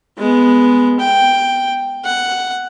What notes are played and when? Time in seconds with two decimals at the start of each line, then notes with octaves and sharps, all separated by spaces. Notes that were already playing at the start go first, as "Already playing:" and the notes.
0.18 G#3 B3
1.00 G5
2.05 F#5